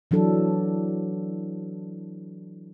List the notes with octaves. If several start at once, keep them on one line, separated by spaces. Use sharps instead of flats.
E3 F#3 D4 A4